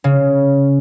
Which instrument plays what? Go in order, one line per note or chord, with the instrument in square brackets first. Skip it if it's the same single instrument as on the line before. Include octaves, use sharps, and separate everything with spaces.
[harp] C#3